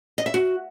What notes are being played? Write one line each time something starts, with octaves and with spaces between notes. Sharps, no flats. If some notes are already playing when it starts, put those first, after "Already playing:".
D#5
E5
F#4